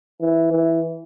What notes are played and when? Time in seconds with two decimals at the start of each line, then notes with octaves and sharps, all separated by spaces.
0.21 E3
0.52 E3